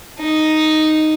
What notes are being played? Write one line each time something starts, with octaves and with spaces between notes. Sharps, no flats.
D#4